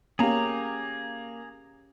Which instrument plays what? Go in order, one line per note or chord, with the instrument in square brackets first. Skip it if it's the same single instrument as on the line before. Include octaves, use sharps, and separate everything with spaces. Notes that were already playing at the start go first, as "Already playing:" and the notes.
[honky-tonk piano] A#3 [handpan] C#4 G4 [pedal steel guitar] G#4 A#5